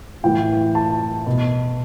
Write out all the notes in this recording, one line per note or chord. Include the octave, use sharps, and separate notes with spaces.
A2 E3 G5
A5
B2